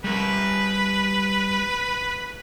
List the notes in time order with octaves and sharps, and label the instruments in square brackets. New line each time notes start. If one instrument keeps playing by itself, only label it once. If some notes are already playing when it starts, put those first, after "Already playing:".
[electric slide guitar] G3 A#4 [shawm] B4